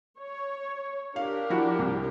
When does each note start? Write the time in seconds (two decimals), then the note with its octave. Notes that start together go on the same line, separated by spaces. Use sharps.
0.19 C#5
1.16 D4 G4 A#4 F5
1.50 F3 E4 F#4
1.79 C2